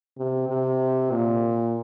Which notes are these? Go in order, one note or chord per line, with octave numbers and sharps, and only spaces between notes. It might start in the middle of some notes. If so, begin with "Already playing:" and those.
C3
C3
A#2